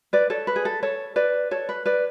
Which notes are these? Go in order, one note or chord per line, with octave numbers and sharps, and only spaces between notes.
B4 D5
A4 C#5
B4
G#4
A4
A4 C#5
B4 D5
A4 C#5
B4
B4 D5